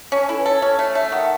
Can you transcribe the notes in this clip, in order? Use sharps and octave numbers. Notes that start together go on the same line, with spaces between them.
C#4 A5
G#5
E4 A4
B4
A4 C#5
C#4
A3 C#5
A3 E5
D#3 F#5